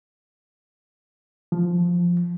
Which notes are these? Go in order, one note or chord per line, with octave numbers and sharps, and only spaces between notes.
F3